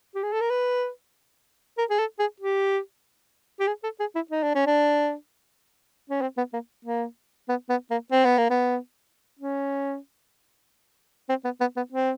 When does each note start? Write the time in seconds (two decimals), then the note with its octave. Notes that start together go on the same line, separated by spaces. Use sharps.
0.15 G4
0.24 G#4
0.33 A4
0.41 A#4
0.50 B4
1.78 A#4
1.90 G#4
1.99 A4
2.19 G#4
2.40 G4
3.60 G4
3.67 G#4
3.83 A4
4.00 G#4
4.15 E4
4.31 D#4
4.43 D4
4.55 C#4
4.67 D4
6.10 C#4
6.22 C4
6.37 B3
6.54 A#3
6.85 A#3
7.49 B3
7.69 B3
7.91 A#3
8.12 C4
8.25 B3
8.38 A#3
8.50 B3
9.39 C#4
11.29 C4
11.45 B3
11.60 B3
11.77 B3
11.92 C4